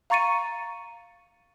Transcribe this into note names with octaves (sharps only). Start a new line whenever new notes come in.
F5 A#5 C#6 A6 C#7 D#7